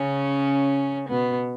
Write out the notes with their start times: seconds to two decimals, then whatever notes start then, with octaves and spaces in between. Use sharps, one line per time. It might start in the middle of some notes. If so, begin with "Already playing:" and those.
Already playing: C#3 C#4
1.09 B2 B3